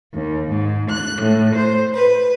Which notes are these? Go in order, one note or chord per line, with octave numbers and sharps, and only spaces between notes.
D#2
G#2
F#6
A2
C5
B4